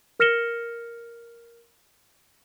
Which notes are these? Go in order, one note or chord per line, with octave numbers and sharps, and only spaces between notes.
A#4 F6 A#6 C#7 E7 G7